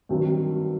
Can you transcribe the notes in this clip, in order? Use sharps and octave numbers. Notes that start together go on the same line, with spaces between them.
G2 D#3 F#3 C4